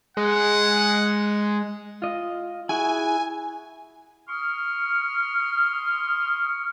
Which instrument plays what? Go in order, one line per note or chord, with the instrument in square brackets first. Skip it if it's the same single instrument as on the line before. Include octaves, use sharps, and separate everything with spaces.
[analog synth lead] G#3 [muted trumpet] F#5
[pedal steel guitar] F4 D#5
[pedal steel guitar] E4 F#4 G#4 [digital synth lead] G#5
[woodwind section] C6 C#6 D#6 F6